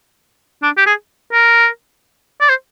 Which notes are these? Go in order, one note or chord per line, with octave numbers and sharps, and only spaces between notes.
D4
G4
G#4
A#4
D5
C5